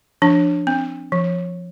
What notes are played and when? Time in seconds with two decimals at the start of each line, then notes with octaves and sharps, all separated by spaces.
0.22 F3 D4
0.67 C4
1.12 F3